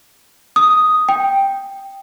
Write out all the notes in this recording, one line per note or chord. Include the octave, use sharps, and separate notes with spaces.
D#6
G5